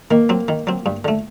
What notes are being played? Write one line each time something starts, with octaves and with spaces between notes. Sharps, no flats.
D#3 A#3
F#3 C4
D#3
F#3 C4
G2
D3 A3